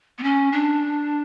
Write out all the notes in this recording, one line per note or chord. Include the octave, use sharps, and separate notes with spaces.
B3
C#4
D4